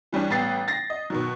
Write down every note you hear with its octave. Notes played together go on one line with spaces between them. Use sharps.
E3 G3 C#4 D4
A1 G3 B3 A6 C7
A6 A#6 C7
D#5
B2 D#3 F#3